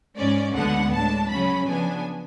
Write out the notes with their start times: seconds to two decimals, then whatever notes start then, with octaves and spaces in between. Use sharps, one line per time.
0.18 G#2 G#3 C#4 D5
0.55 D2 D3 G#3 B3 D4 F#5
0.93 A2 G#3 D4 A5
1.31 C#3 F#3 C#4 B5
1.68 C#3 F3 B3 D4 G#5